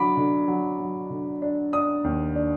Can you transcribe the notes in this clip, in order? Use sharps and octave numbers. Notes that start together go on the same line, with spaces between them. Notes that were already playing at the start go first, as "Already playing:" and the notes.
Already playing: D3 F#3 D4 B5 D6
D3
F#3
F#3
D3
D4
D4 D#6
D#2
D4